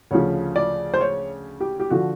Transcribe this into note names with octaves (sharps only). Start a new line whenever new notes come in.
D2 C#3 F3 C#5
D5
C5
C#5
G4
G4
D3 F3 F#4